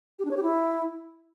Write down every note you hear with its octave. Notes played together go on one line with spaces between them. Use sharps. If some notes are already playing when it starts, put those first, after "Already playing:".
G4
D4
C#5
G4
E4